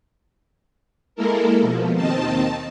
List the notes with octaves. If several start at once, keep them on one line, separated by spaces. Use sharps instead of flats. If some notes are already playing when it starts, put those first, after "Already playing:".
G#3 A#3 E4 A4 A#4
B2 F3
D#2 D#3 C4 D#4 A5